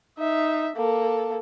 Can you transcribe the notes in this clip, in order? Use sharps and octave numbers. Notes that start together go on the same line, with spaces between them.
D#4 E5
A#3 A4